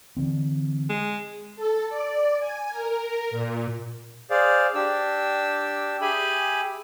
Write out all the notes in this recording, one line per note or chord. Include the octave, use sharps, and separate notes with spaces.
D3 E3 C4
G#3
A4
D5
G#5
A#4
A#2
G#4 C5 D5 F5
D4 G4 E6
G4 G#4 E5 G#5 B5